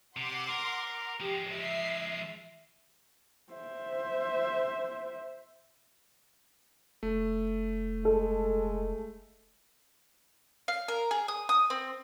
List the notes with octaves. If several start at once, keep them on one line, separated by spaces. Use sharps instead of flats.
C3 F#5 C6 D6
A#4
F3 G#3 G4
E5 C7
C5 E5
F1 A3
G#3 A4
F5
A#4
G#4
D#6
D#6
C4